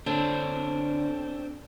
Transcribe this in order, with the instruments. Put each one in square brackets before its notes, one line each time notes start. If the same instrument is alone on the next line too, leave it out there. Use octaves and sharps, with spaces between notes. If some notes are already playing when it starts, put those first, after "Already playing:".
[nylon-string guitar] D3 [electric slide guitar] C4 D4